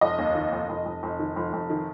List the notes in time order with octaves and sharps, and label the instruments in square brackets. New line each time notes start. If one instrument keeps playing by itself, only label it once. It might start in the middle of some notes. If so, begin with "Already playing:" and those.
[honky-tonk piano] F1 D#5
D#2
D#3
F1
F1
F1
F1
D#3
F1
F1
D#3